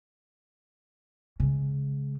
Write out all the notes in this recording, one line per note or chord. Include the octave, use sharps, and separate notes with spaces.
C#3 G#3